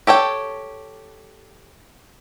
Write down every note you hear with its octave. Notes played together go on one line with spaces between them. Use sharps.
G4 A4 C#5 G5